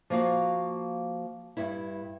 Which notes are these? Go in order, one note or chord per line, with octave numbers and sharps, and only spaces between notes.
F3 A#3 F#4 F5
G2 E4